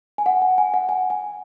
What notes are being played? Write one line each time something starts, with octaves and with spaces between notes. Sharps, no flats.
G#5
F#5
G#5
G#5
F#5
G#5
G#5